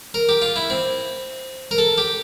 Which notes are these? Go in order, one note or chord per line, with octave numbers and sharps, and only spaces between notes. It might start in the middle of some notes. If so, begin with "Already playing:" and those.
A#4
G4
F4
E4
C4
A#4
A4
G4